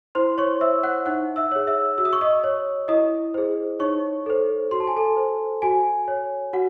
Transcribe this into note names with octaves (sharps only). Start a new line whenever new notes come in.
E4 C5 C6
C#5 C#6
C5 E5 E6
F#5 F#6
D#4 F#5 F#6
E5 E6
G#4 C#5
E5 E6
F#4 E6
D#6
C#6
D#5 D#6
C#5
E4 D#5 D#6
G#4 C5
D#4 C#5 C#6
A4 C5
F#4 C6
A5
G#5
A4 A5
C5
F#4 G#5
C#5
F#4 F#5